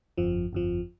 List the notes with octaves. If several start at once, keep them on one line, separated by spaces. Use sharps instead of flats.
G1 F2 F3
G1 F2 F3